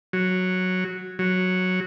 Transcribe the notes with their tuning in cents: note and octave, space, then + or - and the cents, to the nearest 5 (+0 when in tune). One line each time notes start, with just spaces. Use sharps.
F#3 -5
F#3 -5